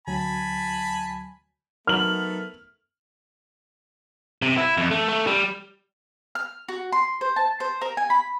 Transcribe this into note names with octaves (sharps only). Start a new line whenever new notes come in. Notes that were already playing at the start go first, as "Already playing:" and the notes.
D2 F#3 G#5 A5 B5
F#3 A3 B3 D#4 A#4 F6 F#7
C3
E4
F2
A3
A3
G3
F6
F#4
C6
C5
A5
C5
A#4
G#5
B5